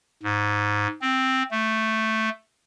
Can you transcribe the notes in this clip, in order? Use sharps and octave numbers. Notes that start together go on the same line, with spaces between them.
G#2
C4
A3